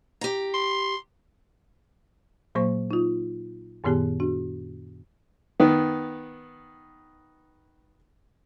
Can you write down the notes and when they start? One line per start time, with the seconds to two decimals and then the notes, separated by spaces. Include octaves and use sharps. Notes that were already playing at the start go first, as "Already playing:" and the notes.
0.21 G4 A#5
0.54 C6
2.55 A#2 F#3 A#3 C5 C#6
2.91 D#4 F4
3.84 F#2 A#2 D#3 B3 G4 G#4
4.20 D4 F#4
5.60 D#3 B3